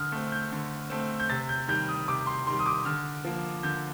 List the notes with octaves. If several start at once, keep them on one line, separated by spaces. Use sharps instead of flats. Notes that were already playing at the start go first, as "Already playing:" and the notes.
Already playing: D3 D#6 F6
A3 C4
G6
D3
A3 C4
G6
C3 A6
G6
D#3 G3 G6
D#6
C3 D6
C6
D#3 G3 C6
D#6
D6
D3 F6
F3 A#3
D3 G6